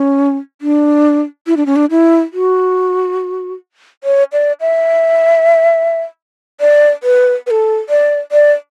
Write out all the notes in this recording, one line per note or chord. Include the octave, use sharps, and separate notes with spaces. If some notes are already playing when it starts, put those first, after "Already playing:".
Already playing: C#4
D4
E4
D4
C#4
D4
E4
F#4
C#5
D5
E5
D5
B4
B4
A4
D5
D5